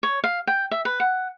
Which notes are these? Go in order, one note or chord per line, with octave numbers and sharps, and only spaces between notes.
C#5
F5
G5
E5
B4
F#5